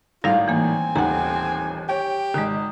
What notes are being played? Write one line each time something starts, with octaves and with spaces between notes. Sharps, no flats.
G#1 A2 G3 F4 F5
E3 A#3 C4 G#5
D#1 A1 D#2 F#5 A#5
G4 C#5 G5
G#1 D#3 G#3 D#5